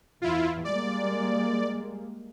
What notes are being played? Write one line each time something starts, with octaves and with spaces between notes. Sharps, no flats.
E2 E4 F4
G3 G#3 A#3 D5